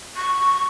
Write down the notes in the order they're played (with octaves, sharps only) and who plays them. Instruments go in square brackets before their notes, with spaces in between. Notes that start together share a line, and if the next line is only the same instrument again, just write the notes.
[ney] C#6